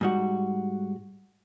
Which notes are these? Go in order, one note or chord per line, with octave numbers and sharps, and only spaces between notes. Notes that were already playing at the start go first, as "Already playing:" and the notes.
G#2 G3 F#4